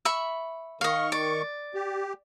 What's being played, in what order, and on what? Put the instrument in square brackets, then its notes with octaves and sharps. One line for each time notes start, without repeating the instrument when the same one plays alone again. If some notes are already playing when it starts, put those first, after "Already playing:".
[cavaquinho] E5 B5 C#6
[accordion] D#3 C#6 [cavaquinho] D#5 F5
[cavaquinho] D5
[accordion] G4